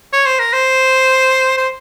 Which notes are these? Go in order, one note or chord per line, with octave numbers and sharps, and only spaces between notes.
C#5
C5
A#4
C5
C5